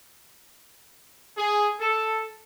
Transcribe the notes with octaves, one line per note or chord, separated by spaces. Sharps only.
G#4
A4